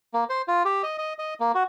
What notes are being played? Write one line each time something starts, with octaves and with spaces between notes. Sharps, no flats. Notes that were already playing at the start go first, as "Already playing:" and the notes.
A#3
C5
F4
G4
D#5
D#5
D#5
A#3
F#4